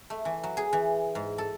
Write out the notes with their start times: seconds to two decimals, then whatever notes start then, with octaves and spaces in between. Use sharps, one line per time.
0.10 A3
0.25 E3
0.44 F#3
0.57 G#4
0.73 E3
1.15 G#2
1.38 A4